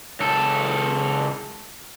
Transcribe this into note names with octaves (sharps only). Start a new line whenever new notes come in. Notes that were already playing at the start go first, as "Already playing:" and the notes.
C#2 A4